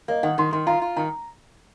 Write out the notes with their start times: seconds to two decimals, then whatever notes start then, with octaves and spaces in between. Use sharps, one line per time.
0.08 A#3 D#5
0.23 D#3 F#5
0.38 D#3 C6
0.52 D#3 C6
0.67 F4 A#5
0.82 F4
0.96 D#3 A#5